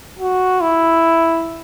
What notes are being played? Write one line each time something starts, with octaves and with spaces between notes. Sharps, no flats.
F#4
E4